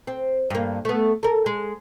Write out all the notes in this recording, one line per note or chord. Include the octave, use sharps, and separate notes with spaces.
C4
G2 A#3
A3 B3
A4 A#4
G#3